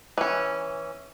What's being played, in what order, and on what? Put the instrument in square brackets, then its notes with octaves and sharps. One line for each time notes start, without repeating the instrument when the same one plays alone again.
[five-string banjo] E3 C#4